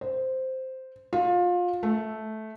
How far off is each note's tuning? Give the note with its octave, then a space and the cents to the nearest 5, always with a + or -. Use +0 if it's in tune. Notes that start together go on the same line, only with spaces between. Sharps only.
C5 -5
F4 +25
A3 -10